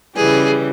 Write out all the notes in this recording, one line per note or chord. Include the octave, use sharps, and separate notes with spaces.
C#3 E3 G3 G#4